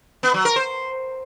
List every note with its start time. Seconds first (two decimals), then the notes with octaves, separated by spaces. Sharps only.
0.23 B3
0.34 F#3
0.45 A#4
0.56 C5